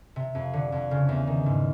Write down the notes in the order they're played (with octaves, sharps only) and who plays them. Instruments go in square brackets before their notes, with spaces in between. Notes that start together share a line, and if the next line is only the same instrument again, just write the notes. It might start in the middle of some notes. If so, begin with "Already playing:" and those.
[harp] C3
F2
D3
F2
C#3
E2
D#3
G#2